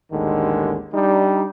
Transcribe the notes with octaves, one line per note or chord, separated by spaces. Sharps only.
A1 D#2 D3 D#3 G#3
G3 D4 D#4